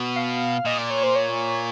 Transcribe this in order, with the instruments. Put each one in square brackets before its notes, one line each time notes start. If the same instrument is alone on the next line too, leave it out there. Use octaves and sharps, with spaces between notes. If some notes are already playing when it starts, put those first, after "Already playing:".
Already playing: [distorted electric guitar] B2
[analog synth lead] F5
[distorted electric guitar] A#2 [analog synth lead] D#5
[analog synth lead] D5
C#5
C5
C#5